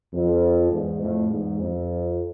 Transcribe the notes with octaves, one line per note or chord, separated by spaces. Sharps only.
F2
E2 G#2
F2 A2
E2 G#2
F2